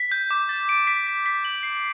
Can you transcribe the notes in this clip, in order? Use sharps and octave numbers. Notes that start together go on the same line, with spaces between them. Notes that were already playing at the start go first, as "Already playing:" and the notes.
Already playing: B6
G6
D6
A6
D7
B6
B6
B6
F#7
C7